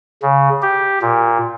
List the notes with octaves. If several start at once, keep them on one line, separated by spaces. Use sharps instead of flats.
C#3
G4
A#2